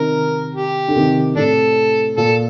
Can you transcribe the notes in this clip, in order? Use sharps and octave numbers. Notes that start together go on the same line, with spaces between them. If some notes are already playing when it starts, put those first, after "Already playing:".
Already playing: C3 D#3 A#4
G4
D3
C3 D#3
A2 C3 D4 A4
A#2 A4